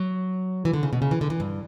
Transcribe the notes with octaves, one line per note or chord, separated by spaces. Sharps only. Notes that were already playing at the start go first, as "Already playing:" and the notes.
Already playing: F#3
E3
D3
C#3
B2
C#3
E3
D3
E3
G2